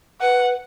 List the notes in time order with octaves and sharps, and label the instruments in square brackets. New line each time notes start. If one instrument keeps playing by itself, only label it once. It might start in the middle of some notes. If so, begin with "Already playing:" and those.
[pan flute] B4 [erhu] F#5